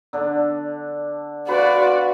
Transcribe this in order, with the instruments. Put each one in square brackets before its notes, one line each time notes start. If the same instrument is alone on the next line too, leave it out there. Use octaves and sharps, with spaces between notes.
[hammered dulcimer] D3 D4
[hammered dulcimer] F4 B4 [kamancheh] F#4 D5